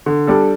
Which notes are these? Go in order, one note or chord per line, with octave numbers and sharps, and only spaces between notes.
D3
G3 D4 A4